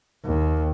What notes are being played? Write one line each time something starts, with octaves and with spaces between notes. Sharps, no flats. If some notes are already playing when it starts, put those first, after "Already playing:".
D#2